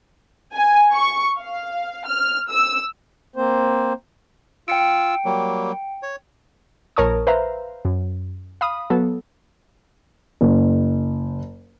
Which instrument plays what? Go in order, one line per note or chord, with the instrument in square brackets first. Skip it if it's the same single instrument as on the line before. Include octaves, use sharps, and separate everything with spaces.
[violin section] G#5
C#6
F5
F6
E6
[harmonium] A#3 C4 C5
[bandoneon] F4 E6 [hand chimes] G5 C#7 D7
[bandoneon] F#3 G3 A#3
C#5
[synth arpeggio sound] A#1 A#4 C#5 A5 C#6 D#6
B4 C5 E5 F5 A#5
F#2
F5 B5 D#6
F#3 B3 A4
[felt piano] F#1